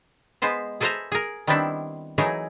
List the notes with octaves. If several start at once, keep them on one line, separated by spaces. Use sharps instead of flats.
G#3 B3 B4 C5
G#4 A4 B4 C5 E5 A#5
G#4 A#4
D#3 G3 B3 C4 D4 E4
E3 F#3 A3 D#4 G#4 A#4